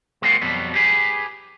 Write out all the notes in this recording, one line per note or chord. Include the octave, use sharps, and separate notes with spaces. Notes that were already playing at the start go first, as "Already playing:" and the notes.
G#3 A#3 C4 C#4 F4 F#4
F2 B2 F#3 G3 B3
G4 G#4 B4